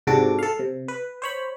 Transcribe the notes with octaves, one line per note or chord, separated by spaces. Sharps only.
G#2 C3 D4 F#4 A4 D6
A4 F5
C3
B4
C5 C#5 B5